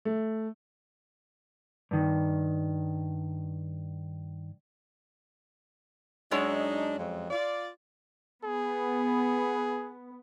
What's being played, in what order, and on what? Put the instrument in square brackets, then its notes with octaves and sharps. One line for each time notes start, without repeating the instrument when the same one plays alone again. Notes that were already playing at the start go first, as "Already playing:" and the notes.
[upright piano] A3
[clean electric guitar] G2 D#3
[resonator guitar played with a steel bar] F#2 G#3 C#5 [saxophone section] D4 D#4
[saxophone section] F2
F4 D5
[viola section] B3 [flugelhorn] G#4